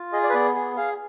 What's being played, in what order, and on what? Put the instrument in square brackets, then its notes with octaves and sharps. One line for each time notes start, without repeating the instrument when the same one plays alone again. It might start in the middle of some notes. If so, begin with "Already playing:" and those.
Already playing: [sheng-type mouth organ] F4
G#4 D#5
D5
B4
B3 D5
G#4
G#4 F5